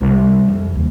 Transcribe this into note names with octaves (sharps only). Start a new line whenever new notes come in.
C2
F2
D#2